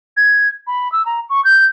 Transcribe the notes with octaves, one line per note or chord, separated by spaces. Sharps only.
G#6
B5
E6
A#5
C#6
G6